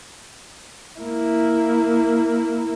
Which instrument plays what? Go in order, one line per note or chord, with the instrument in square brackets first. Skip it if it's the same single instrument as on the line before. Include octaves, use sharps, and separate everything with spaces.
[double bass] A#3 E4